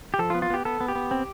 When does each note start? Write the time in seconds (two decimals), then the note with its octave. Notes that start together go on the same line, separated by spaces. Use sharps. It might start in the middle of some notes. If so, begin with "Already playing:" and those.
0.14 G4
0.19 F3 A4
0.30 F4
0.35 B3
0.42 F4
0.50 B3 G4
0.65 B3 A4
0.81 B3
0.88 G4
0.95 B3
1.11 C4